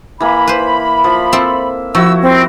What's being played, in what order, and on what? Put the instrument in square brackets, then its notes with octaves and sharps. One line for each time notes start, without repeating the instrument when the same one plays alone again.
[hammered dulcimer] E3 A#3 [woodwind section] B5
[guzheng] B4 C5
[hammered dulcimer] F3
[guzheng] C4 A4 [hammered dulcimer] E5
[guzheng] F3 [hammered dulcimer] E4 F#4 C#6 [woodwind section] E6
[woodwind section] C4